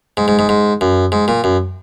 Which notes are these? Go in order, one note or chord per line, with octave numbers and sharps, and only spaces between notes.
G#2
G#2
G#2
G#2
F#2
G#2
A#2
F#2